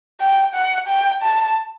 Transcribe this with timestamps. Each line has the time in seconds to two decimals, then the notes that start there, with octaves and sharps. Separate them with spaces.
0.20 G5
0.54 F#5
0.88 G5
1.22 A5